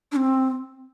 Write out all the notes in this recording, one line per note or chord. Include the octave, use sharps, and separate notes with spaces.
D4
C4